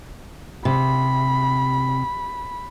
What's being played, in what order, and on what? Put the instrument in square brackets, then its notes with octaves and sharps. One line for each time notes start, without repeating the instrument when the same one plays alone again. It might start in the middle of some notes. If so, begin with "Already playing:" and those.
[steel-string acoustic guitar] C3 [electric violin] B5